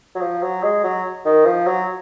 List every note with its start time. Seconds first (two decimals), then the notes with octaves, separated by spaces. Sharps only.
0.15 F#3
0.21 F3
0.42 F#3
0.63 G#3
0.84 F#3
1.25 D#3
1.46 F3
1.66 F#3